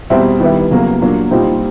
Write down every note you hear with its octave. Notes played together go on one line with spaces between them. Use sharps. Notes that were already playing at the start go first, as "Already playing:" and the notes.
E2 B2 G3 C4 E4
D#3 G3 B3 E4
E2 C#3 F#3 A#3
A#2 F#3 A#3 D4
C2 A#2 G3 C4 D#4